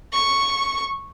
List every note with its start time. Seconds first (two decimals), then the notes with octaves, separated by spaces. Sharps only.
0.13 C#6